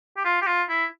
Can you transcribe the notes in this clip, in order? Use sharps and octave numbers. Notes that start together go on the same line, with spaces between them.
G4
F4
G4
F4
E4